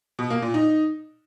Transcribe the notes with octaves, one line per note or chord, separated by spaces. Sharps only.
B2
A#3
A#2
D#4